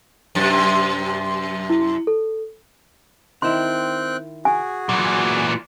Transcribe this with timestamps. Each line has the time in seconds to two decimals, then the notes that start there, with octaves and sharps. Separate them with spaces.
0.35 F#2 C3
1.70 E4
2.07 A4
3.42 D#3 C4 E4 G5 C6 F#6
4.45 F#4 G#4 G#5
4.89 A#2 E3 F#3